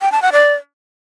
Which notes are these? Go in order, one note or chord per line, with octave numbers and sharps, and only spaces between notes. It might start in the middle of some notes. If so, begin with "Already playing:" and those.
G5
A5
F#5
D5